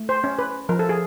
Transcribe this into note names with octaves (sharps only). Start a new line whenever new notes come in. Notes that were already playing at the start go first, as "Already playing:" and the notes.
Already playing: A3
C5
C#4
B4
F3 A#4
A4
G#4